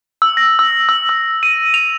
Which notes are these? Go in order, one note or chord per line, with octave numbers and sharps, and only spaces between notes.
E6
A#6
E6
E6
E6
D#7
F7